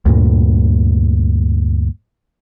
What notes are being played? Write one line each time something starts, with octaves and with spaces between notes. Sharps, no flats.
D2 G2 A#2